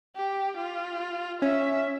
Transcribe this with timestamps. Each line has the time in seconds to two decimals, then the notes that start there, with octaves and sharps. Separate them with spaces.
0.16 G4
0.57 F4
1.42 C#4 E5